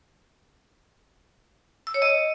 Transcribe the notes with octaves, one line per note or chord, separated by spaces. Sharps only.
E6
C#5
D#5